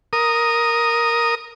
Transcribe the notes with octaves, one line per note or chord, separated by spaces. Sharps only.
A#4 D#6